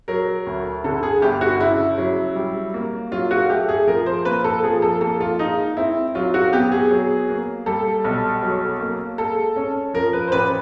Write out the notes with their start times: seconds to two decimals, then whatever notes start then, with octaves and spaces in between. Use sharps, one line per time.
0.08 F#3 A#4
0.47 D2
0.84 D3 A4
1.03 G#4
1.22 G1 G4
1.41 F#4
1.60 C#3 E4
1.98 F#3
2.36 G3
2.74 A#3
3.12 F#3 F4
3.31 F#4
3.50 A3 G4
3.69 G#4
3.87 F3 A#4
4.06 C5
4.25 A#3 B4
4.44 A4
4.63 F3 G#4
4.82 A4
5.01 A#3 A4
5.20 F4
5.39 G#3 D#4
5.77 C4 E4
6.15 F#3 F4
6.34 F#4
6.53 B3 G4
6.72 G#4
6.90 F#3
7.29 A#3
7.66 G3 A4
8.04 B1
8.42 F#3
8.80 A#3
9.18 G#3 A4
9.56 C#4
9.94 F3 A#4
10.13 B4
10.28 C5
10.32 A1 B4